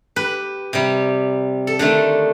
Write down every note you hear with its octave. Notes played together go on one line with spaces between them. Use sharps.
G4 B4
C3 G3
A4
D3 D#3 A3 D4